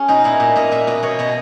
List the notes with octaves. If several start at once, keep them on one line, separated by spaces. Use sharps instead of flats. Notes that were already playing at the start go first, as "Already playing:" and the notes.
Already playing: C#4 G#4
B2 D#4
A#2 E4
A#2
A#2 D#5
A#2 E5
B2 D#5
B2 C#5
B2 D#5